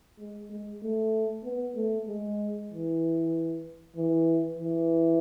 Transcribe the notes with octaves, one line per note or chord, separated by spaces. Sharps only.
G#3
G#3
A3
B3
A3
G#3
E3
E3
E3